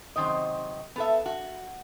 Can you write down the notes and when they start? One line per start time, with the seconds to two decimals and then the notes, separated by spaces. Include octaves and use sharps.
0.16 F#2 C3 D#3 C5 D#5
0.96 B3 A4 E5
1.26 F#4